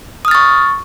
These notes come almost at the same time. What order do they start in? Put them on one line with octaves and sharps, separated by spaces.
D#6 F6 A6 C#6